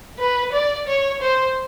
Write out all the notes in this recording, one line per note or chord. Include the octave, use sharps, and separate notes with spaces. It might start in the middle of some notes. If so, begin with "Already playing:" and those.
B4
D5
C#5
C5